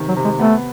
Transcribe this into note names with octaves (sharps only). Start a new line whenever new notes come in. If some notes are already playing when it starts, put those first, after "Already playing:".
Already playing: C3 D#3
F#3
C3
G#3
A3 B3